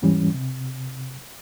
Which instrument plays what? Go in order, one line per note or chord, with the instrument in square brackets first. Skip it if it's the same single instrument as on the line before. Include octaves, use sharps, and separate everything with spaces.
[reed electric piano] E2 G#2 E3 G3 C#4
C3